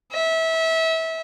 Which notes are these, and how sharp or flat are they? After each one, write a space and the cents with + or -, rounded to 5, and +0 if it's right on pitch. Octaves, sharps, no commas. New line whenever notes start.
E5 -25